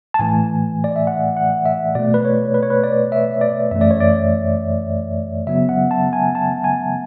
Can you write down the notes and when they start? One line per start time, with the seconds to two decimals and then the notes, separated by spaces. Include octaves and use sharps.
0.14 A5
0.19 A2 E3 A3 G#5
0.84 D5
0.96 E5
1.07 F#5
1.37 F#5
1.66 E5
1.95 B2 A3 D5
2.14 B4
2.25 C#5
2.54 B4
2.63 C#5
2.70 B4
2.84 D5
3.12 E5
3.41 D5
3.71 F#2 E3 A3 E5
3.81 D5
3.91 C#5
4.00 D5
5.47 C#3 F#3 B3 E5
5.69 F#5
5.91 A5
6.13 G#5
6.35 A5
6.64 G#5